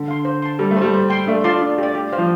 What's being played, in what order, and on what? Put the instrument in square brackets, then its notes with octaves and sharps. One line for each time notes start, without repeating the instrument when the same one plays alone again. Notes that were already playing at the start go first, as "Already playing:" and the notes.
Already playing: [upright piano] D3
[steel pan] F5 C6
C5
A5 C6
[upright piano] G3 [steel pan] A4
[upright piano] A3
[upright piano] G3 [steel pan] C5 A5
[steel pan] C5
G5 C6
[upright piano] A3 [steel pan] D4
[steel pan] F4 D5 A5 C6
D4
G4 D5
G4
C5 F5
[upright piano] F3